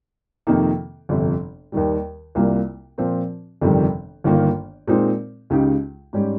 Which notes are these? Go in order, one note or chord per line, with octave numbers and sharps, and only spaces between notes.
F2 C3 D#3 A#3 D#4
G1 F2 C3
D#2 D#3 G3
C2 C3 G3 A#3 F4
A#2 F3 C4
G1 F2 C3 D#3 G3
G1 G2 D#3 A#3 F4
A#2 G#3 C4 D#4
C#2 C#3 G#3 D#4 G4
G#2 G3 C#4 G4